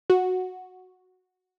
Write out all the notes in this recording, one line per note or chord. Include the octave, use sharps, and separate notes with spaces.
F#4